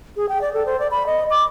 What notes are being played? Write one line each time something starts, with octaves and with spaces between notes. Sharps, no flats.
G#4
G5
D5
A4
C5
D5
B5
D#5
D6